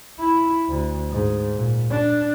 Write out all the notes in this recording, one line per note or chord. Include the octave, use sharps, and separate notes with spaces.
E4
D2
G#2
A#2
D4